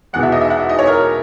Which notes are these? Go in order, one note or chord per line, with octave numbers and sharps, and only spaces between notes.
E1 E2 B2 F#5
E5
D#5
E5
F#5
E5
D#5
C#5
A#4